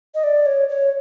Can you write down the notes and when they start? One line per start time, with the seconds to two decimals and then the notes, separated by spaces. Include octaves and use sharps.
0.15 D#5
0.24 D5
0.46 C#5
0.69 C#5